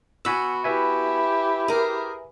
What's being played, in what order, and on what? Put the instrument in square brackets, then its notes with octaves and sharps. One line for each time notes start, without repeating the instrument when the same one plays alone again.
[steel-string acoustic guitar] B3 F#4 [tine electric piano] G#5 B5 E6
[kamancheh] E4 G4 [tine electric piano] B4 E5 G#5
[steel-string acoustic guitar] G#4 A#4